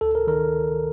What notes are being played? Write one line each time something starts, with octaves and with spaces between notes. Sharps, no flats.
D2 A4
A#4
D#3 A#4